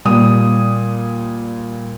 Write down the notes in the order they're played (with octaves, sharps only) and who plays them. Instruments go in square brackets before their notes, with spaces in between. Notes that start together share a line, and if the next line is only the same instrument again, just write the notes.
[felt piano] A#2 G3 D#6